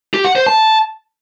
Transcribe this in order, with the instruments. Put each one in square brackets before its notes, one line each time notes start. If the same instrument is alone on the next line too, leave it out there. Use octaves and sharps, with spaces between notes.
[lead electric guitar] G4
F#5
C5
A5